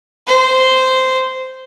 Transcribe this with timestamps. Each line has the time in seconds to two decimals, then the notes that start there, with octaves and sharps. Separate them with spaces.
0.27 C5